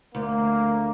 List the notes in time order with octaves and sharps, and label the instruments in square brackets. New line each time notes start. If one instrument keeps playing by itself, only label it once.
[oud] D2 [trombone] A#3